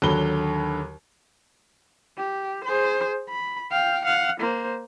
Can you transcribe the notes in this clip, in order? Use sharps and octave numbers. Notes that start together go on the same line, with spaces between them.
D#2 D3 F#3 B5 G7
G4
G#4 C5
B5
F5 G5
F5 F#5
A#3 C5